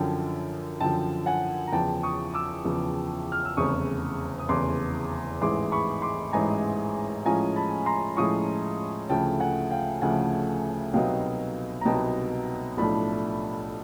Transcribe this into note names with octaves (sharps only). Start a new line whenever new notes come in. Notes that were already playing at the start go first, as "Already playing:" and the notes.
Already playing: F#2 D3 F3 G5 A5
F#2 D3 F3 G5 A5
F#5 G#5
A#5
E2 C#3 F3 G5 A5
C#6 D#6
D6 E6
E2 C#3 F3
F6
E6
F1 E2 C#3 C#6 D#6
D#6
F1 E2 C#3 C6 D6
A1 G#2 E3 G#3 C6 D6
B5 C#6
C6 D6
A1 G#2 E3 G#3 G#5 A#5
A2 F3 G#3 C#4 F4 G#5 A#5
A5 B5
A#5 C6
A2 F3 G#3 C#4 F4 C#6 D#6
D2 C#3 F3 A3 G5 A5
F#5 G#5
F5 G5
D2 C#3 F3 A3 F#5 G#5
C2 B2 F#3 B3 D#4 F5 G5
A#5
C2 B2 F#3 B3 D#4 G5 A5
B1 A2 F3 A3 D4 A5 B5